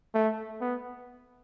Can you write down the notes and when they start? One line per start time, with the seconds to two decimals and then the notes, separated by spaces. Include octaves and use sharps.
0.15 A3
0.61 B3